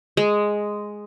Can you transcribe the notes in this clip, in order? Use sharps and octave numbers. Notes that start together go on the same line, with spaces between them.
G#3